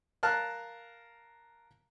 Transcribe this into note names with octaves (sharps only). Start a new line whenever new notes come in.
A#4 F5 A5 F6 F#6